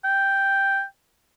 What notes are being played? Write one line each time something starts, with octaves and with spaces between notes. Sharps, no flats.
G5